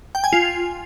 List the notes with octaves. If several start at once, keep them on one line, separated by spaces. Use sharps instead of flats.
G5
G#5
F4